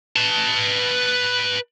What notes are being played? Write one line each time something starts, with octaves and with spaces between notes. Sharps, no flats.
B4 A5